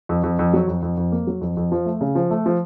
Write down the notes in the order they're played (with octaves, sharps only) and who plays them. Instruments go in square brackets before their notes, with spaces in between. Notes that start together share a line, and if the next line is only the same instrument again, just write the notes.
[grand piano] F2
F2
F2
F#3
F2
F2
F2
A#3
F#3
F2
F2
F3
A3
C#3
F3
A3
F3